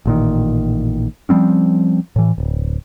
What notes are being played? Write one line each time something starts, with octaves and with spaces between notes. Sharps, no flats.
A1 A#2 D#3
F3 G3 C4 C#4
A2 E3
D1